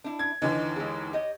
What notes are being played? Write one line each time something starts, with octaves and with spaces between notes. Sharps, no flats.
D4 E4
G#6
D#2 D3 E3 D#5
G#3 E4 G#4
G4 C#5 D#5